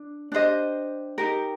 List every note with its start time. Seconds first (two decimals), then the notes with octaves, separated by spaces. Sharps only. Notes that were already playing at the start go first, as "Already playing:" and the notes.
Already playing: D4
0.32 D4 G4 C5 D#5
1.18 D#4 G4 A#4